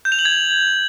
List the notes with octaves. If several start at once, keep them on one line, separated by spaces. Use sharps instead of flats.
G6
F7
F#7
G#6